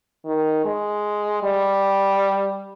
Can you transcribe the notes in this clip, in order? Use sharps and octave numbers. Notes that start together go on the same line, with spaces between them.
D#3
G#3
G3